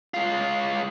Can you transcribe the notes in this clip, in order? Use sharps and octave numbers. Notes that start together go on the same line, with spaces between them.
G#3 F4